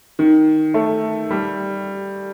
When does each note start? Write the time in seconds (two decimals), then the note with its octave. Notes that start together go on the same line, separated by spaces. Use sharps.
0.19 D#3
0.74 A3
1.31 G3